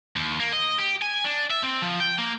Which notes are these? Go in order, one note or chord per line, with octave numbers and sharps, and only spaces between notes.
D#2
A#3
D#5
G4
G#5
D4
E5
C4
F3
G5
A#3